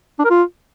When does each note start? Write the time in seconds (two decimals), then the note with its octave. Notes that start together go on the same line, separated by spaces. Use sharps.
0.19 D4
0.24 A#4
0.30 F4